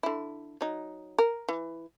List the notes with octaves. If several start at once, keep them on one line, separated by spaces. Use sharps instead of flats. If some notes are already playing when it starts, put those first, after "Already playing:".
D3 E4
F#3 D#4
A#4
E3